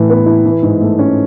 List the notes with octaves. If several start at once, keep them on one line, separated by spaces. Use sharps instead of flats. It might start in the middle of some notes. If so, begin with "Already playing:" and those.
Already playing: A2 E3
B3
E4
E3
G#2
A3
C#4